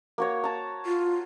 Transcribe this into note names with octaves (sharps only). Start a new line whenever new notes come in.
A#3 F#4 C#5
A5 A#5
F4